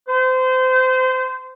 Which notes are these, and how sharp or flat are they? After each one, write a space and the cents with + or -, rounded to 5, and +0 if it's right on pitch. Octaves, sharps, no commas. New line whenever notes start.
C5 -25